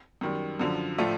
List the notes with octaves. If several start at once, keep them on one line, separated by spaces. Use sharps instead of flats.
F#2 D#3 G3
F#2 D3 F3
A2 F3 A3 D4 F4